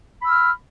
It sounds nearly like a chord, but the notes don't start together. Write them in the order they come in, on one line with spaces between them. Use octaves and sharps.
B5 E6 F6